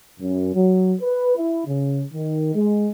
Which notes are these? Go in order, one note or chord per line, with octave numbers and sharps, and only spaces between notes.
F#2
F#3
B4
E4
C#3
D#3
G#3